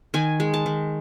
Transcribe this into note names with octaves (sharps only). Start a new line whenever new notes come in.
D#3 G#5
G#3
A5
D#3